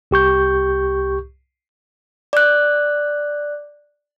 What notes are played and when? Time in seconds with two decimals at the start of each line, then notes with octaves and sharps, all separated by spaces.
0.11 C2 G4 C#6 G6
2.33 D5 F#6